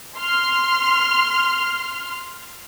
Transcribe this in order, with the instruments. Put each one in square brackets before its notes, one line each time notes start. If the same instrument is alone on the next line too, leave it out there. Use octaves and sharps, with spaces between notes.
[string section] C6 F6